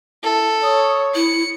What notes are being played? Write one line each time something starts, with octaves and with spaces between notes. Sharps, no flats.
E4 A4
C#5 D#6
E4 C#7